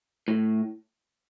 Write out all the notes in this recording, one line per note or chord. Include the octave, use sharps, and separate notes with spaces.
A2